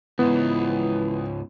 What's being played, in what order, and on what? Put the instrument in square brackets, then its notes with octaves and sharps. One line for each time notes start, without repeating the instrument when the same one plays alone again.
[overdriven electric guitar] C#2 G#2 [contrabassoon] E3 [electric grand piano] B3